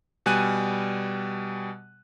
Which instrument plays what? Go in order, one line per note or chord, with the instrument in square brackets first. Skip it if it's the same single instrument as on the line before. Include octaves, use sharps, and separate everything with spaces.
[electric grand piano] B2 G3 G#5 F#6 D#7